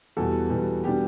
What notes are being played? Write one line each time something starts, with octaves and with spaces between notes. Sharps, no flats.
E2 B2 G3 A4
E2 B2 G3
B2 G3 D4 G4